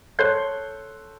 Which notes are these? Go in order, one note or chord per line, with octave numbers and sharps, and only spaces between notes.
A4 C#5 C6 F#6 G6 C7